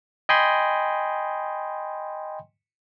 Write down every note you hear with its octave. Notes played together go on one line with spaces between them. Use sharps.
D#5 G5 G#5 B5 C6